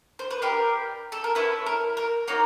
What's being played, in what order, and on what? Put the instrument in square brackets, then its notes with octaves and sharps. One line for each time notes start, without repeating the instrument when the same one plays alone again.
[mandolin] C5
B4
D4 G4 A#4
A4
A#4
C#4 E4 A4 B4
A#4
A#4
A#3 D#4 F#4 C#5